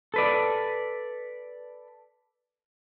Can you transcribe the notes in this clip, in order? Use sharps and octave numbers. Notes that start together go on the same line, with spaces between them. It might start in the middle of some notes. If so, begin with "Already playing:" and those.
A4 B4 D5